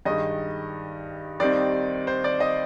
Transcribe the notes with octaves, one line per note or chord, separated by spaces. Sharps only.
G2 D#3 G#3 D#5
D#2 D#3 G3 C4 D#4 D5
C5
D5
D#5